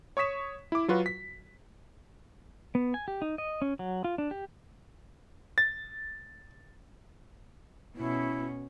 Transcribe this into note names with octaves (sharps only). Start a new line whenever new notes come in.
C#5 C#6 D#6 B6 E7
E4 D6
F#3 F4 F#4 B4
B6
B3
G#5
G4
D#4
D#5
C#4
F#3
F4
D4
G4
A6
B2 C#4 E4